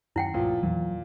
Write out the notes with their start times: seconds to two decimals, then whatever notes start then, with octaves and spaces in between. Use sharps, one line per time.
0.16 F#2 D#3 C#4 E4 F#5 G5
0.34 C2 G2 A#2 F3 A3
0.63 E2 A#2 E3 F#3